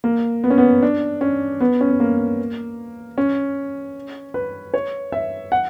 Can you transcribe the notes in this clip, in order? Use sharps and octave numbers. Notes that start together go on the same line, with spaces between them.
A#3
B3
C#4
B3
D4
C#4
B3
C#4
B3
A#3
C#4
B4
C#5
E5
F#5